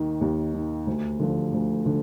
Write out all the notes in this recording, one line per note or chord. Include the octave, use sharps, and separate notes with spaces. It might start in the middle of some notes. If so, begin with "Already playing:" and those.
Already playing: D#2 D#3
D#2
D#3
D2
D3 F3
D2
D3